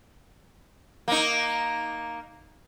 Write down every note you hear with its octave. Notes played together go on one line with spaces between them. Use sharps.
A#3 D#4